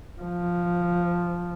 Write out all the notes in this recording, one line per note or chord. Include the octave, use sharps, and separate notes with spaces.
F3